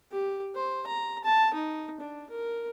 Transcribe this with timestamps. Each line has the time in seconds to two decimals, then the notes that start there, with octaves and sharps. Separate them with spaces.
0.12 G4
0.56 C5
0.87 A#5
1.25 A5
1.54 D#4
2.01 D4
2.30 A#4